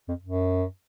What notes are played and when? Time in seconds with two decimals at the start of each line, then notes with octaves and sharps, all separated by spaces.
0.08 F2
0.23 F#2